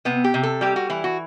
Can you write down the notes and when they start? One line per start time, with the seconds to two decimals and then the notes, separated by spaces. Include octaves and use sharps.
0.05 C3 B3
0.24 G4
0.34 C3
0.43 A4
0.61 G3 G4
0.76 F#4
0.90 E3 E4
1.04 F#4